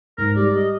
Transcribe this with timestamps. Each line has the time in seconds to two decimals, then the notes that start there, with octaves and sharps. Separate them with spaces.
0.18 G#2 A#4
0.36 G3 D5
0.55 D#5